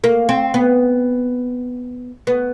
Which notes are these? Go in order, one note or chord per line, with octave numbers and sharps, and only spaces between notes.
A#3
C4
B3
B3